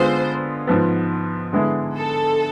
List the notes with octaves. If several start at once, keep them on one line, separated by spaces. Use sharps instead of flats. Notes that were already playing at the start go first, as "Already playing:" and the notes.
Already playing: D3 G#3 B3 F4 G#4 C5
G#2 F3 B3
D3 G#3 B3 E4 G#4
A4